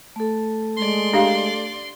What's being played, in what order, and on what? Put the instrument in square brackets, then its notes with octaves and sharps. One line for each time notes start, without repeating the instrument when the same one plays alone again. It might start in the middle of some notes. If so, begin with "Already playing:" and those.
[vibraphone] A3 A4
[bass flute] G#3 [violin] D5 C6
[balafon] D4 G4 F5